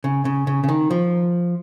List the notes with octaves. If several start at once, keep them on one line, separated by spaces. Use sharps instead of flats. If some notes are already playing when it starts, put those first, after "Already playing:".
C#3
C#3
C#3
C#3
D#3
F3